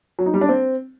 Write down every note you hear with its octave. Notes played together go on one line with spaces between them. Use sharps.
F#3
D#4
G3
D4
C4